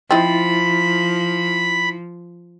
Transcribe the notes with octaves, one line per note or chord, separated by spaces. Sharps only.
F3 C4 D#4 E4 B5 A6